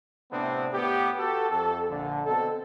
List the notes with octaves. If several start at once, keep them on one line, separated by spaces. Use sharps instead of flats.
A2 C3 B3 C4 D4
A2 B3 G4
F#4 G4 A4
F2 A4
A#1 D3
B2 C4 A4